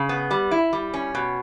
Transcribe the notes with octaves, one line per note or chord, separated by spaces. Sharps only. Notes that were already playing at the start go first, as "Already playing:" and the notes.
Already playing: C#3
B3
G3
E4
G3
C#4
B2